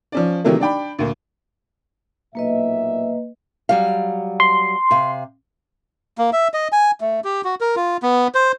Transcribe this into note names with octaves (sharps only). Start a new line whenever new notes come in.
F3 C#4 D5
C3 D#3 E3 F#3 A3 A#3
D4 D5 G5 B5
D2 A#2
B1 A#2 A#3 B4 D#5 E5
F#3 G3 F5
C6
C3 F5
A#3
E5
D#5
G#5
A3
G4
F#4
A#4
F4
B3
C5